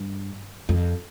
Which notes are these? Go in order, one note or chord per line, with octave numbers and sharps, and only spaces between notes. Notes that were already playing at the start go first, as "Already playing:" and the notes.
Already playing: G2
F2